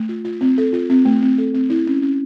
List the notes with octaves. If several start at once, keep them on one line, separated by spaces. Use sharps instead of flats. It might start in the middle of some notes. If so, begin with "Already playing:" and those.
Already playing: A3
F4
F4
C4
A4
F4
C4
A3
C4
A4
C4
E4
C#4
C#4